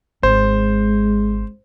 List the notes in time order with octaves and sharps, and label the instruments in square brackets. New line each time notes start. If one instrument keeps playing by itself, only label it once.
[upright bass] G#1 [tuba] G#3 [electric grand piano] C5